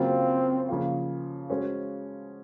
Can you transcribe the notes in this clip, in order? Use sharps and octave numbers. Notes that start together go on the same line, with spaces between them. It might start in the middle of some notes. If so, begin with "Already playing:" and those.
Already playing: C#3 F#3 A#3 C4 F4
C#3 F3 A#3 F4
G#3 C#4 F#4 C5